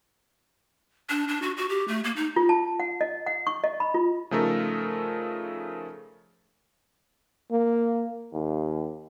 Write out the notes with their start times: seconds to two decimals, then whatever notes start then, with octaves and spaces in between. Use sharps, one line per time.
1.10 D4
1.28 D4
1.42 F#4
1.57 F#4
1.69 G4
1.88 A3
2.04 A#3
2.16 D#4
2.36 F4
2.49 A5
2.80 F#5
3.01 D#5
3.27 F#5
3.47 C#6
3.64 D#5
3.80 B5
3.94 F4
4.31 C#3 F3 A3 D#4 A4 A#4
7.51 A#3
8.33 D#2